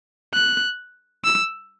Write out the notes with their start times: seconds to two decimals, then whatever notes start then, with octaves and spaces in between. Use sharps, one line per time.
0.34 F#6
1.24 E6